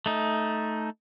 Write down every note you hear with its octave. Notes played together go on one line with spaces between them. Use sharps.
A3 D#4